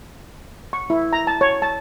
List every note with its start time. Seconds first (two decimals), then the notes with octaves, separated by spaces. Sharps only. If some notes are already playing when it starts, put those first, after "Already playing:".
0.73 C#6
0.90 E4
1.13 A#5
1.27 A5
1.41 C#5
1.62 A5